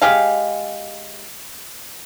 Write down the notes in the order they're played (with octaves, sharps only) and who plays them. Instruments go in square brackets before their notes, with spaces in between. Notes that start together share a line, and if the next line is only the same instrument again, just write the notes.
[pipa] G#3 G4 G#4 F5